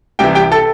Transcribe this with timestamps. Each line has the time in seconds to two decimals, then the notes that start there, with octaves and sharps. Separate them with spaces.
0.19 C2 C3 E3 G4 G5
0.35 G4 G5
0.52 A4 A5